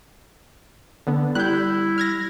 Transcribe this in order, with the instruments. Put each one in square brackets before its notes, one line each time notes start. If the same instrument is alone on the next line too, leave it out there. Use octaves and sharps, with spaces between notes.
[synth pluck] D3 B3
[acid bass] G3 [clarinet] E4 [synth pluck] F#6 G6
[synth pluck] F6 G#6 A#6